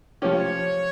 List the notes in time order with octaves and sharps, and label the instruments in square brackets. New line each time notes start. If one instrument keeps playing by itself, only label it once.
[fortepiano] F3 C#4 G4 [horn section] C#5